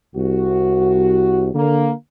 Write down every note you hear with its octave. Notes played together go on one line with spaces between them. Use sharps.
C2 F#4
D3 A#3